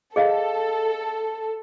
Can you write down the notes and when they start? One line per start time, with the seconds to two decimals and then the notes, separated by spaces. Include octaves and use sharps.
0.16 G#4 A4 D#5 F5